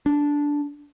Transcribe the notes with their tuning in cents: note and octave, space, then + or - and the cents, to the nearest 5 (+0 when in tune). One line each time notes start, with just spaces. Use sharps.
D4 -10